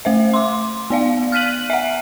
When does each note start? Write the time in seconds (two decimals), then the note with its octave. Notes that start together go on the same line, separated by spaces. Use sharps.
0.05 A3 C5 E5
0.34 C6 D6
0.90 B3 D5 F5
1.32 F6 F#6 B6 D#7 F#7
1.70 E5 F#5